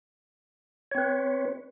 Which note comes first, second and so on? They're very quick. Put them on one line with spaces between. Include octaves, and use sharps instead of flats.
C#5 C4 B4